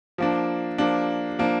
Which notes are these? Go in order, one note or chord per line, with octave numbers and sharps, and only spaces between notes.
F3 A#3 D4
F3 A#3 D4
F3 A#3 D4